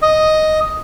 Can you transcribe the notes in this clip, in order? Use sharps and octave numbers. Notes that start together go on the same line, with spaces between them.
D#5